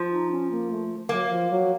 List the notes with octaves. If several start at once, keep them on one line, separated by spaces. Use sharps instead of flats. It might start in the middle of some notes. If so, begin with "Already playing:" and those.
Already playing: F3
D#4
C#4
A#3
A3
F#3 A#3
F3
F#3